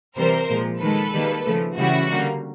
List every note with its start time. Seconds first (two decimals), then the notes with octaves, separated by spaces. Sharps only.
0.17 C3 E3 G3 A#4 C5
0.49 A#2 F3 G#3
0.80 D#3 G#3 A4 B4
1.13 D#3 G3 A#3
1.45 C#3 F3 A3
1.78 C#3 E3 G3 E4 F#4
2.10 D3 G3 A#3